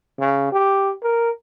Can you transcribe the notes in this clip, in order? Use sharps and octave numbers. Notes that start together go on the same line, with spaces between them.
C#3
G4
A#4